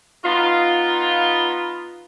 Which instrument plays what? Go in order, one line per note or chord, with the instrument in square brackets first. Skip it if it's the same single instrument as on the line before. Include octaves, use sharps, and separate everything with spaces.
[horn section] B3 D#4 F4